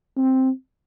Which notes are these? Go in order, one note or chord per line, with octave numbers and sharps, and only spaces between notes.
C4